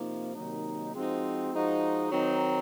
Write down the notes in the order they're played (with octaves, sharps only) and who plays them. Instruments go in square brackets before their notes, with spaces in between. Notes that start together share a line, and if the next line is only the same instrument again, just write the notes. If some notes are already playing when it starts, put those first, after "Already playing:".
Already playing: [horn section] C3 F3 A#3 D#4
C3 D#3 F#3 A#3 D#4
F3 G#3 C4 D#4 F#4
F3 G#3 D#4 F#4
D#3 F#3 C4 D#4